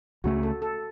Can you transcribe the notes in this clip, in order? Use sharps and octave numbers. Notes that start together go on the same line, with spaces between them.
C#2 C#3 A3 F#4
A4
A4